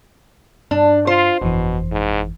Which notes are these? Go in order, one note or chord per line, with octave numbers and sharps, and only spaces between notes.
G2 D4
F4 C5
G1 F2 B2 E3
G#2